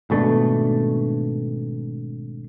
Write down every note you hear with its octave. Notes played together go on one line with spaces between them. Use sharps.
G#1 B2 A3 D4